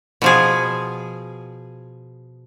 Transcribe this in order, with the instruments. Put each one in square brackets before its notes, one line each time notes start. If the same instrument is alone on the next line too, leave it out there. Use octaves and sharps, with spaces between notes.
[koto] B2 F3 G#4